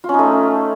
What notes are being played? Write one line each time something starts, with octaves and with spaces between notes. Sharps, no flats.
A3 C#4 D#4 F4